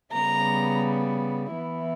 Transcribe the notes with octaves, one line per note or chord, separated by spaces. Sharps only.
C#3 G3 B3 A#5
E3 B3 E4